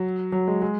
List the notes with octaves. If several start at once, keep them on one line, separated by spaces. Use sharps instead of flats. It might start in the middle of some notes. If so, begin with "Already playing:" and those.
Already playing: F#3
F#3
G#3
G#3